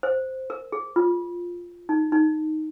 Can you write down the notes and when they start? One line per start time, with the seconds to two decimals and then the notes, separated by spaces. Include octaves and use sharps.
0.03 C5
0.50 A#4
0.72 G#4
0.96 F4
1.89 D#4
2.12 D#4